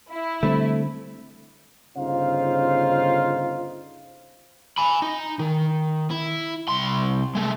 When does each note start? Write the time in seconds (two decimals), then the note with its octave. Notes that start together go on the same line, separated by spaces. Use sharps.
0.10 E4
0.43 D3 G3 A3 C4
1.96 G1 C#3 D#4 F4 C5 F5
4.78 G#5 B5
5.02 D#4
5.39 D#3
6.11 E4
6.69 C2 C6
7.35 G#3 A3